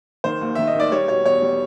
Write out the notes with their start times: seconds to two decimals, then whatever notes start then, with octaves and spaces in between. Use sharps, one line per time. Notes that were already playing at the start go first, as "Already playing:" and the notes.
0.24 D#3 C5
0.41 D#2
0.55 D#3 E5
0.67 D#5
0.75 D#3 D5
0.92 G3 C#5
1.08 B2 C#5
1.25 E2 C#5
1.42 G3